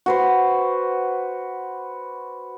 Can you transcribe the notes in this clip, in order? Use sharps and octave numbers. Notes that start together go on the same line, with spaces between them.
F#4 B4 C5